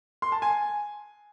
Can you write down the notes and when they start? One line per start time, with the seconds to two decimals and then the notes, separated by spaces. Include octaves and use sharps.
0.22 C6
0.32 A5
0.42 G#5